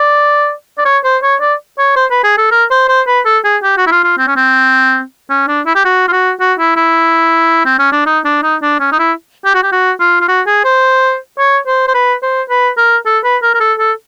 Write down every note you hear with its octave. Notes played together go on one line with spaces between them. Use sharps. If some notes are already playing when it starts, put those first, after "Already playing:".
Already playing: D5
D5
C#5
C5
C#5
D5
C#5
C5
B4
G#4
A4
A#4
C5
C5
B4
A4
G#4
G4
F#4
E4
F4
F4
C4
C#4
C4
C#4
D4
E4
G4
F#4
F4
F#4
F#4
E4
E4
C4
C#4
D4
D#4
D4
D#4
D4
C#4
D#4
E4
G4
F#4
G4
F#4
F4
F4
F#4
G#4
C5
C#5
C5
C5
B4
C5
B4
A#4
A4
B4
A#4
A#4
A4
A4